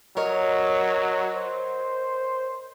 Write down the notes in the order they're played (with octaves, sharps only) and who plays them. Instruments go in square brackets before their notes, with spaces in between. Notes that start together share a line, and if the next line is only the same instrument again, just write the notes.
[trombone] F#3 [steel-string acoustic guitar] A#4 C#5 D#5
[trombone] C5